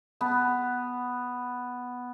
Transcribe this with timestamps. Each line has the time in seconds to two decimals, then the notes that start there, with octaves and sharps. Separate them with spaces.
0.21 B3 A5